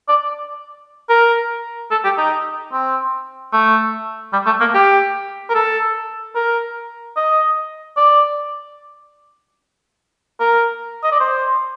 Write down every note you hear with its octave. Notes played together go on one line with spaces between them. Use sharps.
D5
A#4
A4
G4
D#4
C4
A3
G3
A3
A#3
G4
A#4
A4
A#4
D#5
D5
A#4
D#5
D5
C5